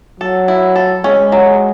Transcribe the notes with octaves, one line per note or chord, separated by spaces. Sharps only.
F#3 A4
E4
A4
G#3 C#4
F#3